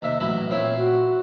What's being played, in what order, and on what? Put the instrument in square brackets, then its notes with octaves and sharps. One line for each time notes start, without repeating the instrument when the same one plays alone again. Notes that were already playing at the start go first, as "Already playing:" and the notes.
[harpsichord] D#2 C3 E5 [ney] D#5
[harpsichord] A1 F#3 E4 [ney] E5
[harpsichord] A#2 C4 E4 [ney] C#5
[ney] F#4